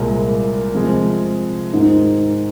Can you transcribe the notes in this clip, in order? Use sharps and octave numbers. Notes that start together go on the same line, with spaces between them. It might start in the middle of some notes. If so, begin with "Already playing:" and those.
Already playing: C2 A#2 G#3
C3 F3 G#3 C4
G#2 D#3 G#3 D#4